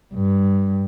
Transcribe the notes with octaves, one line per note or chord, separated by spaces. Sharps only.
G2